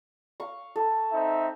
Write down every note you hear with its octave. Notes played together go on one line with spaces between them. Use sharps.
F5 C#6
A4
C4 D#4 E5